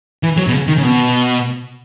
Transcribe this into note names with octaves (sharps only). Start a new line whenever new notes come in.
E3
F#3
B2
C#3
D#3
C#3
B2